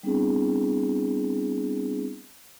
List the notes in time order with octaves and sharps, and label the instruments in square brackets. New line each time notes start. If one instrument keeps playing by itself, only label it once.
[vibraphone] G3 B3 C4 D4 E4 G#4